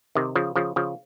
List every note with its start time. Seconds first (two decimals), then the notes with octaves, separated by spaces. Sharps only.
0.15 C3 D#3
0.35 C#3 F3
0.56 C#3 F3
0.76 C#3 F3